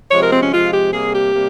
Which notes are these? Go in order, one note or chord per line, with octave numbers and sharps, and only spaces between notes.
C3 F3 G#3 C#5
A#4
C4
C#4
C3 F3 G#3 F4
G4
C3 G3 A#3 G#4
G4
C3 G3 A#3